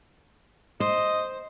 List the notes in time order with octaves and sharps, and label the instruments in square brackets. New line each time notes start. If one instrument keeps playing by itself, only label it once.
[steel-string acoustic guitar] C5 [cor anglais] D#5